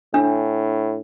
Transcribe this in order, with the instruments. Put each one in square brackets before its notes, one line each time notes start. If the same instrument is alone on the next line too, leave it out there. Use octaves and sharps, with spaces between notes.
[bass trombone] A2 [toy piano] D4